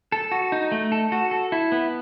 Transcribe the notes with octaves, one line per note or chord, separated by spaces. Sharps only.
A4
F#4
D#4
A3
A4
F#4
A4
E4
B3